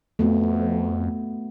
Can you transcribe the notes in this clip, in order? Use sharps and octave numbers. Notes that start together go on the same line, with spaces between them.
F2 A3 B3 F#4